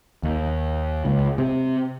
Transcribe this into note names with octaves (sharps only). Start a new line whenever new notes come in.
D#2
C#2
C3